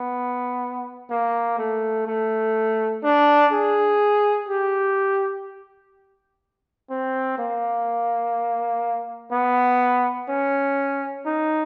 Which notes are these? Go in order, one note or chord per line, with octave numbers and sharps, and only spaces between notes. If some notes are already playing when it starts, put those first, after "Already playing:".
Already playing: B3
A#3
A3
A3
D4
G#4
G4
C4
A#3
B3
C#4
D#4